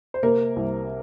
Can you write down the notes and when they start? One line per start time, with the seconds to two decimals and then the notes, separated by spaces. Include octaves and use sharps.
0.14 C5
0.23 C3 A#3 A#4
0.56 C2